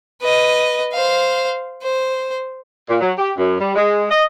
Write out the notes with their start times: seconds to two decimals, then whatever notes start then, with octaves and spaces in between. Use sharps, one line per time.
0.22 B4 D#5
0.93 C5 F5
1.83 C5
2.89 A#2
3.01 F#3
3.18 G4
3.37 F#2
3.60 G3
3.75 G#3
4.10 D#5